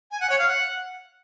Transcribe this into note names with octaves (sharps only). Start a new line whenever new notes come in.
G#5
F#5
C#5
F5
F#5